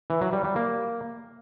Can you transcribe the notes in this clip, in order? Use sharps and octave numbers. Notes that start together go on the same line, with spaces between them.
E3
F#3
G3
G3
A#3